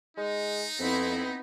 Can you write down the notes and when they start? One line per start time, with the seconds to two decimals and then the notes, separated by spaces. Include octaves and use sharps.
0.17 G#3 D#4
0.79 F2 B3 C4 E4